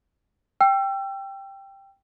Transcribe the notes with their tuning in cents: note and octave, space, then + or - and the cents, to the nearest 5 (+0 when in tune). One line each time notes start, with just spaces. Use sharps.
G5 +0 E6 +35